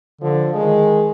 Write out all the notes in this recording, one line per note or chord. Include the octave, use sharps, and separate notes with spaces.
D3 F3
D#3 G#3